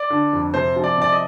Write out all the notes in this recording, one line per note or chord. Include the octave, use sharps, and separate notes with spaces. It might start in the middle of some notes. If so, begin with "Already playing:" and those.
Already playing: D5
D3
F2
C3 C5
F3
D5
C3 D5
D#5